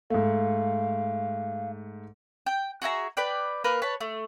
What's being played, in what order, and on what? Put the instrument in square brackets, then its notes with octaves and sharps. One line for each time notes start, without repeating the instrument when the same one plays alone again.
[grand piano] G#2 A3 [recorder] F5
[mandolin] G5
F#4 G#4 E5 A#5
B4 D5 G5
A#3 A#4 B4
B4 C#5 A5
A3